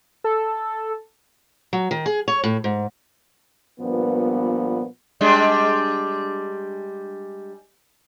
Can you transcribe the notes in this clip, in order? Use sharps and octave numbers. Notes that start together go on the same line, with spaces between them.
A4
F#3
D#3
G#4
C#5
A2
G#2
G2 A#2 F3 B3
G3 G#3 D4